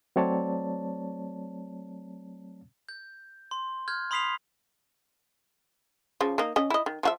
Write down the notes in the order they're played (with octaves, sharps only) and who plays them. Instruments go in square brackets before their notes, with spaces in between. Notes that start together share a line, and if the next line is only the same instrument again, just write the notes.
[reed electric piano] F#3 A3 C4 C#5 D5 A5
[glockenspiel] G6
C6
F6 G6 G#6
B5 C6 D#6 B6 C7 F7
[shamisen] C#3 F3
A#3 D#4
C#4 D#5
E4 D#5
D#3
F3 F#4 E5